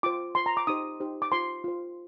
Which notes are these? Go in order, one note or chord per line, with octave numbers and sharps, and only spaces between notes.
F4 C5 D6
F4 C5 C6
A#5
D6
D#4 G4 C5 D#6
D#4 G4 C5
D6
F4 C5 C6
F4 C5